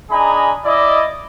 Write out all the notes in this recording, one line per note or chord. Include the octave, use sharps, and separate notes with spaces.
D4 D#4 G#4 G#5 A#5 B5
E4 D5 D#5